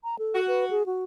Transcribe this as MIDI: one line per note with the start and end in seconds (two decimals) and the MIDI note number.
0.04 0.15 82
0.19 0.40 69
0.35 0.78 66
0.48 0.65 71
0.70 0.86 68
0.86 1.04 66